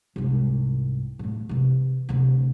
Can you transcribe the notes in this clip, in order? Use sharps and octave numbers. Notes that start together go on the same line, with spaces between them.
C2 G#2
A2 A3
C3 E3
D2 C3